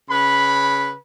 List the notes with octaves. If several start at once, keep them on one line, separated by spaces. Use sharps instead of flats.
C#3 B4 B5